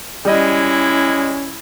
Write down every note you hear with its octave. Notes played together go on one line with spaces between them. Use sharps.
G3 G#3 C#4 E4 D#5